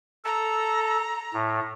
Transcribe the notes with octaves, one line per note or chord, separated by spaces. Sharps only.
A4 A#5
A2